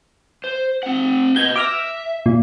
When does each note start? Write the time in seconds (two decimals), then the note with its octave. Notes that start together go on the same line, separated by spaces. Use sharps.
0.44 C5
0.83 C4 F#5
1.36 F#4 B4 D#5 G6 G#6
1.56 E5 D6 F6 A#6
2.26 A#2